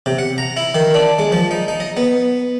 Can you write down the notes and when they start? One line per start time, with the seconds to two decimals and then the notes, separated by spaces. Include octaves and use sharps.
0.06 C3
0.19 F#5
0.38 A#5
0.57 E4
0.75 D#3
0.94 D4
1.19 G#3
1.32 F3
1.51 D#4
1.68 D#4
1.80 D#5
1.97 B3